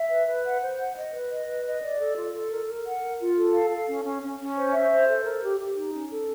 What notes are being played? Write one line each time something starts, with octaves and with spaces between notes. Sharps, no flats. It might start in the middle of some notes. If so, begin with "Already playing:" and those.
Already playing: E5
B4
B4
F#5
C5
F#5
D#5
B4
D#5
B4
D#5
D5
A4
F4
A4
A#4
A#4
F#5
A#4
F4
A4
F5
A4
C#4
C#4
C#4
C#4
C5
E5
C5
A4
A#4
G4
G4
D#4
C#4
A4